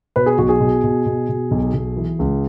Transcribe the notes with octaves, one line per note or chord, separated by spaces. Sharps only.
B2 B4
G#4
B1 F#4
G#4
B2
B2
B2
B2
B1
B1
E3
C#2